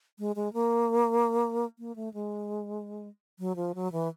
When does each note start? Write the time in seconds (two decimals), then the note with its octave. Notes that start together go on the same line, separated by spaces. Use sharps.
0.19 G#3
0.36 G#3
0.53 A#3
1.79 A#3
1.96 A3
2.14 G#3
3.39 F#3
3.56 F3
3.75 F#3
3.92 E3